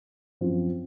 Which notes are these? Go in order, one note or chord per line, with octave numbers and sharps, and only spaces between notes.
F#2 F3 C4 F4